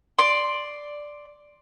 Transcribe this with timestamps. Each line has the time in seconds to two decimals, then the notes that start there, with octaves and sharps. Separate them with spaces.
0.19 D5 C6